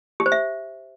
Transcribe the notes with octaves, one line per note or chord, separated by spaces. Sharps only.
G4
C5
E5